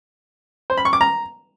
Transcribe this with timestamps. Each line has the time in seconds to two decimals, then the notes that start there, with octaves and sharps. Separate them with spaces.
0.70 C5
0.77 B5
0.85 C#6
0.93 D6
1.01 A#5